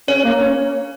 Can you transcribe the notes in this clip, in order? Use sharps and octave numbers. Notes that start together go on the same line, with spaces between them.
C#4 C#5
A#3
C#4